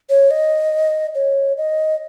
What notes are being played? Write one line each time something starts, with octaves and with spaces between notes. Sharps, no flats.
C#5
D#5
C#5
D#5